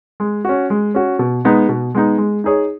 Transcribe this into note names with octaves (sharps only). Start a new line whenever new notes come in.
G#3
C#4 F#4
G#3
C#4 F#4
B2
G#3 B3 D#4
B2
G#3 B3 D#4
G#3
D#4 G#4 C#5